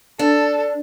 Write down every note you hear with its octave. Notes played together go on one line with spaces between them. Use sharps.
D4 A4